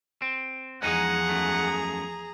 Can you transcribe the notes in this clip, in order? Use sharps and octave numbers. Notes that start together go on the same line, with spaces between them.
C4
E2 F3 G#3 D#4 G#4 F#5 A#5
F#2 A3